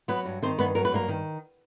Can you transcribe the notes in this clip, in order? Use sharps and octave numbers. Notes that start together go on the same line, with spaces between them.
F#3 B3 B4
G2
D#3 C4 C5
G2 B3 B4
F#3 A#4
B4
G2 A#3 A#4
D#3